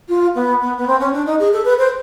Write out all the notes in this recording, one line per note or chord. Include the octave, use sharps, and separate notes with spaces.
F4
B3
B3
B3
C4
C#4
D4
D#4
G#4
A4
B4
C5